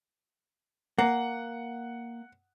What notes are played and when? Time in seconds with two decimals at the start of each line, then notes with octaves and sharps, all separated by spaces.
0.98 A#3 F#5